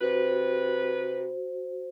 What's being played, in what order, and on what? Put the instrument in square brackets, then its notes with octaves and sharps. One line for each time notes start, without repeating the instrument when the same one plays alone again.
[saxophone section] C3 B4 [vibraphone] F#4 C5